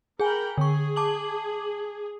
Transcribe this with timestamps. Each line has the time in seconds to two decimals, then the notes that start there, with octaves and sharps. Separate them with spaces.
0.20 G#4 A#4 G5 G#5 B5
0.58 D3 G#4 C#6
0.96 A5 D6 F#7